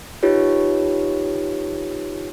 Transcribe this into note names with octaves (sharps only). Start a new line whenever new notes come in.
D#4 F4 G4 B4 C#5